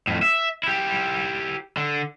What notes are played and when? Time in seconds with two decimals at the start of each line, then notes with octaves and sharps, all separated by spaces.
0.07 F2 A2
0.22 E5
0.63 E4 G4
1.77 D3